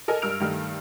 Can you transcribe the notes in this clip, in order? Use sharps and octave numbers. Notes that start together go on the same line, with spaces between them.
A4 A#4 D#5 G#5
G2 A#4 E6 F6 D7 F7
G2 D#3 A3